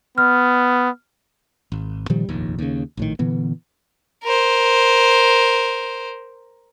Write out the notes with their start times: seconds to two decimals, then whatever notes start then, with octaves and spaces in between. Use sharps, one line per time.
0.18 B3 F6
1.72 G#1
2.10 A#2 D#3 F3 G3
2.29 F1 A#1 D#2
2.59 D#2 C#3
2.97 A#1 A2 D#3
3.19 A#2 D3 E3 B3
4.24 A#4 C5